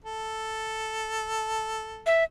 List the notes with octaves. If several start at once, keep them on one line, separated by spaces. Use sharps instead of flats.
A4
E5